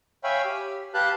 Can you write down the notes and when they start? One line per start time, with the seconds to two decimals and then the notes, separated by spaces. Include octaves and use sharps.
0.24 C#5 E5 F5 G5 G#5 B5
0.45 G4
0.94 G4 B4 F5 A5 F#6 G6